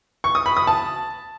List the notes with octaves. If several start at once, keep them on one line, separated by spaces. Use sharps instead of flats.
C#6
D#6
B5
D#6
A5